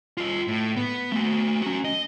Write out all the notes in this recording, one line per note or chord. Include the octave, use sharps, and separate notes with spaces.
F4 D#5
A2
B3
A3 F#4
C#4 F#4
D#5